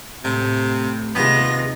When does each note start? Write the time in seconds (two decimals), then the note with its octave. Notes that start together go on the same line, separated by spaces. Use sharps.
0.25 A2 C3
1.15 D#2 C3 G#3 B3 F4 A#6